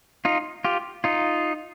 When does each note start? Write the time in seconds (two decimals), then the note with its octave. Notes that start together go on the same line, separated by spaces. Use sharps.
0.25 D#4 F4
0.65 F4 G4
1.04 D#4 F4